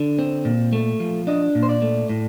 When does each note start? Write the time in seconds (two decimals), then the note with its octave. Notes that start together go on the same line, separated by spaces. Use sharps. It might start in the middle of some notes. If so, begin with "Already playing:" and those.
Already playing: D3
0.19 C4
0.45 A#2
0.73 A3
1.00 F3
1.27 D4 D#5
1.55 A#2
1.63 C5
1.69 D5
1.82 A3
2.09 A2